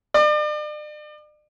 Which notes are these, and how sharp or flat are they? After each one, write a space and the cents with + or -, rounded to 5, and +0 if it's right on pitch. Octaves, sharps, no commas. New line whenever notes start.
D5 +40